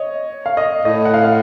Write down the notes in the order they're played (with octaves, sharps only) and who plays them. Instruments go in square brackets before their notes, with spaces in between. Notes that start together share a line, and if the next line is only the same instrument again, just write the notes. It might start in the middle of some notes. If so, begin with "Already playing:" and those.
Already playing: [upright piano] C#5 D#5
F5
D#5
[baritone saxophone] A2 [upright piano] D#5
[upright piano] F#5
F5
F5